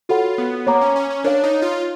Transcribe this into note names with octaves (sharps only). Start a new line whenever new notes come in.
F4 F#4 A4 C#5 F#5 B5
B3
A#3 C#5 F#5 A#5 D6
C#4
C#4
C#4
D4 A#4 C#5 F5
D#4
F4